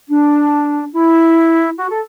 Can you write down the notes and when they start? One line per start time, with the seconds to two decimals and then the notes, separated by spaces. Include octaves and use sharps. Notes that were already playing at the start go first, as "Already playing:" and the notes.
0.10 D4
0.95 E4
1.80 F#4
1.90 A4